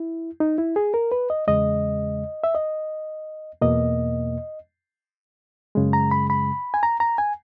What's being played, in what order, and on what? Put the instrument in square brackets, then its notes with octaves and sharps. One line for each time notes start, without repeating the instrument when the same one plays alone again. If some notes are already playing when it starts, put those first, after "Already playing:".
Already playing: [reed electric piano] E4
D#4
E4
G#4
A#4
B4
D#5
E2 C#3 G#3 D#5
E5
D#5
E2 B2 A#3 D#5
F#2 C#3 G#3
A#5
B5
B5
G#5
A#5
A#5
G#5